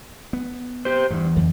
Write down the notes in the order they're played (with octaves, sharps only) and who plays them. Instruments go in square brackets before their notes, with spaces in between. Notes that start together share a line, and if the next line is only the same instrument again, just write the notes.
[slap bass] B3
[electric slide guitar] G4 C5
[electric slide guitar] E2 [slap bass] G2
[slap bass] F2 D3